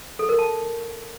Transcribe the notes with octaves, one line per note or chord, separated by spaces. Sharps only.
A4
A#4
A5